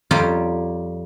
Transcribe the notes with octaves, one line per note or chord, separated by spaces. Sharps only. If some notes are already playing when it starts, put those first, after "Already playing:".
F2 G3 F4 G4 C#5 A#5